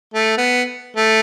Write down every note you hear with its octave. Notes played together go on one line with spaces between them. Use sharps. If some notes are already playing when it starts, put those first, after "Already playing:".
A3
B3
A3